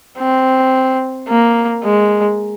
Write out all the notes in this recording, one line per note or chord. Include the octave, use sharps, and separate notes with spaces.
C4
A#3
G#3